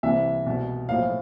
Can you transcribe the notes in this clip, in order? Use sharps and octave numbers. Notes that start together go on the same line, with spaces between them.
C2 C3 E3 E5
C2 B2
B1 A2 F3 F5